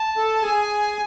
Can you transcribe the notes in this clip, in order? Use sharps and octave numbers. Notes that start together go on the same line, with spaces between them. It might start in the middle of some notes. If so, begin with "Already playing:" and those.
Already playing: A5
A4
G#4 G#5